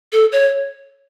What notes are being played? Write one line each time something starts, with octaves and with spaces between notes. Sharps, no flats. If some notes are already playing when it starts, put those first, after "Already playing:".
A4
C#5